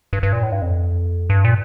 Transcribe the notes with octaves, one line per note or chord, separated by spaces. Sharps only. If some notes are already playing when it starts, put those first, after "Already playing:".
G2
G2
A#2
A2
G2
F2
G2
A#2